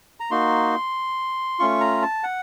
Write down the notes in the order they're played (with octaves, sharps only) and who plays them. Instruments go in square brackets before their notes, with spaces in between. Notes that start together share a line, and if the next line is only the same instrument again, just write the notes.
[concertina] A#5
A#3 D#4 F#4 C6
A3 C#4 F4 C#6
A#5
A5
F#5